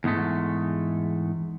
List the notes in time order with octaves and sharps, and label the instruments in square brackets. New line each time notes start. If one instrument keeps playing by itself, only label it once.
[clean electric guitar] E2 G#2 G#3 A3